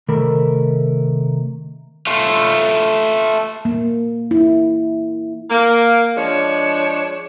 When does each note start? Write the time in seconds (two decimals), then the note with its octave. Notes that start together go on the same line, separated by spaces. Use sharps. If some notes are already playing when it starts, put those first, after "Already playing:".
0.09 C3 D#3 A3 A#4 B5
2.07 A3 F4
3.65 A#3
4.31 E4
5.50 A#3
6.16 F3 G#3 D4 C#5